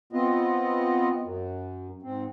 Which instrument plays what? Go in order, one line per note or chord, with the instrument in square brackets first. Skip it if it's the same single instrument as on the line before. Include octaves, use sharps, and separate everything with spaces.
[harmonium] B3 C4 F4 D#5
F#2
G#2 C4